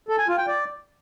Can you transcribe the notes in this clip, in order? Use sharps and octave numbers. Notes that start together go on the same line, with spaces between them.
A4
G#5
F4
G5
D5